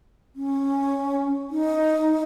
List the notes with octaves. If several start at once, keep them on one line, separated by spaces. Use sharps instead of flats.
C#4
D#4